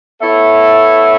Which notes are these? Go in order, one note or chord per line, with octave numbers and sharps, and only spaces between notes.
B3 E4 A4 C#5 E5